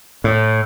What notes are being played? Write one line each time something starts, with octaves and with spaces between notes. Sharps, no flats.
A2